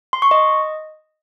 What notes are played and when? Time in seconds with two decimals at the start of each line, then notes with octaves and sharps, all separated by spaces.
0.13 C6
0.22 C#6
0.31 D#5